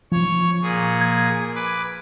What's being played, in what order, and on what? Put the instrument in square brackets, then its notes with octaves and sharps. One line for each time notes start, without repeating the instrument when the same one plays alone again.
[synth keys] F3 [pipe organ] C#5
[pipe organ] A#2 G#4
[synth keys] G#6
[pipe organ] B4 D6